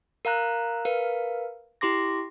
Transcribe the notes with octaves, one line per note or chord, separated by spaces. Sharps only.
A#4 F5 A#5 F#6
A#4 B4 F5
E4 G4 C6 D6 A#6